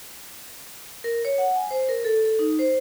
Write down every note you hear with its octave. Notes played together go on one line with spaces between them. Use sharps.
A#4
C#5
F#5
G#5
C5
A#4
A4
A4
D#4
C5